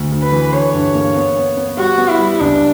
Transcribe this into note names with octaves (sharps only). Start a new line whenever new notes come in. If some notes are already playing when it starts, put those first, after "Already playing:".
Already playing: D2
D2
B4
E3
D3 C#5
G2
A#3
B3
B3
B3
G3 F#4
B3
E4
G3
C#2 D4